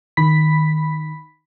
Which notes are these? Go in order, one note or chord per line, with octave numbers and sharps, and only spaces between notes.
D#3 B5 B6